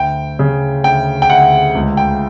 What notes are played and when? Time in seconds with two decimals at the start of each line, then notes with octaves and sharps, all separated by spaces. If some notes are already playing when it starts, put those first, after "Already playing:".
Already playing: D2 G5
0.39 C#3
0.84 D2 G5
1.22 G5
1.29 D2 F#5
1.75 C#2
1.97 G5